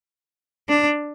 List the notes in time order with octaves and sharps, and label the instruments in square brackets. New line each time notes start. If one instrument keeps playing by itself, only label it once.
[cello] D4